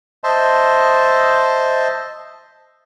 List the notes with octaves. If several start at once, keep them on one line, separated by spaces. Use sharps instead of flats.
C5 D#5 E5 A5 C6